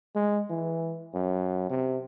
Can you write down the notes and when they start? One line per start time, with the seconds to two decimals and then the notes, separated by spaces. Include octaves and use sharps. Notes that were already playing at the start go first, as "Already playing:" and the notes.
0.16 G#3
0.50 E3
1.14 F#2
1.70 C3